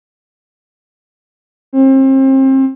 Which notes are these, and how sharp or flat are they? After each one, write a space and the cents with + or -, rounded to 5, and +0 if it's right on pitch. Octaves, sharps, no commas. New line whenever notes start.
C4 +35